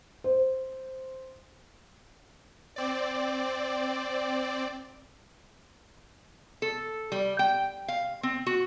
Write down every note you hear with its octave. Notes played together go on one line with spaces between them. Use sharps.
C5
C4 D5
A4
G3
G5
F5
C4
F#4